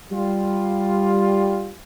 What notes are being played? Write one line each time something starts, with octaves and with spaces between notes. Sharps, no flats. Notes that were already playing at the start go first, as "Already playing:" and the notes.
G3 F4